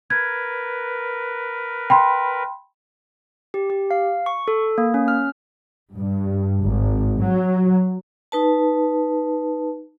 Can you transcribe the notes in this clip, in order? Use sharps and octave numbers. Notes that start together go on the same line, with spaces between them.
A#4 B4 G#6
G5 B5 C6
G4
G4
F5
C#6
A4
A#3
C#4
F6
G2
G#1
F#3
D#4 B4 A5